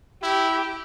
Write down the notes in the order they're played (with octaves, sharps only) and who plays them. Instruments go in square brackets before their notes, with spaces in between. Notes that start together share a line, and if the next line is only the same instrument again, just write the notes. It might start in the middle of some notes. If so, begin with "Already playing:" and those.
[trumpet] E4 [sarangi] G4